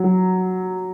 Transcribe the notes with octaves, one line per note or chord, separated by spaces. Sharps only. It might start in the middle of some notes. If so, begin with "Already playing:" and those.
Already playing: F#3